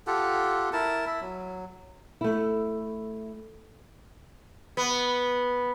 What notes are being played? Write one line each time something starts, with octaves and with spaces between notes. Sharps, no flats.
F4 G4 A4 F#5
E4 A#4 A5
E4 E5
F#3
A3 E4
B3